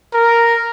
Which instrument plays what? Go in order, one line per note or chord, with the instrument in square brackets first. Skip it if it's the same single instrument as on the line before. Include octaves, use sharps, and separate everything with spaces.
[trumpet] A#4